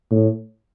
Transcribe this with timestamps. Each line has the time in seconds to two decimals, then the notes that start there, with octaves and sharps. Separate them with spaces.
0.11 A2